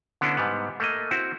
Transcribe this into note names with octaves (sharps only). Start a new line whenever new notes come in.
D3 B3 C#4 D4 E4
G#2 G3 B3
A3 A#3 D#5
C4 E4 F#4